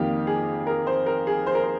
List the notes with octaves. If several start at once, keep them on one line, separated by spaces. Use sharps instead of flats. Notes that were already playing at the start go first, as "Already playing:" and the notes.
Already playing: F2 D#3 A#3 G4
G#4
A#4
C5
A#4
G#4
C5
A#4
C5